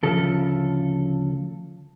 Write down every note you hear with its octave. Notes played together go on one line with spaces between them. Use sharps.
D2 C#3 F3 A4